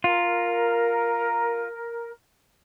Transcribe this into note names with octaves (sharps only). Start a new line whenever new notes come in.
F4 A#4